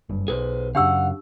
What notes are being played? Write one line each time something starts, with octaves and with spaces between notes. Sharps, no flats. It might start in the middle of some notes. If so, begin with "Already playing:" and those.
F#1 G2
B1 G#4 B4 C5
F#2 C#3 D4 G4 F5 F#5 E6